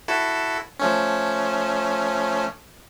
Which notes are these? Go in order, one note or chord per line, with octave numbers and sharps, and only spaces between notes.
E4 F#4 A4
F3 A3 C#4